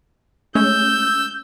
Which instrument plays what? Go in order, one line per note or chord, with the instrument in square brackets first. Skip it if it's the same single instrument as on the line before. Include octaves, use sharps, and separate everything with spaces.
[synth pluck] G#3 A3 C#4 [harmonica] E6 [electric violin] G6